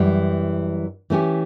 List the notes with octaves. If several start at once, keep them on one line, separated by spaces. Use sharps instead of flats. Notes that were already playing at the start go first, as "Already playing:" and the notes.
Already playing: F#2 E3 G3
E3 A3 C#4 G4